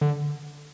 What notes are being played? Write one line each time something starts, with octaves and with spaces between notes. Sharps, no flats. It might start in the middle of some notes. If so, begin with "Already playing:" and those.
D3